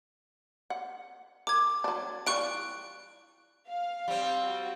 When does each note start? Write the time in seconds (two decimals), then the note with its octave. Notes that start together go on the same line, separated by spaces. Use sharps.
0.70 F#5
1.47 A#4 D6 G#6
1.84 F#3 D4
2.27 E3 G3 F4 C#6 F#6 D7
3.67 F5
4.08 G3 C4
4.44 F#4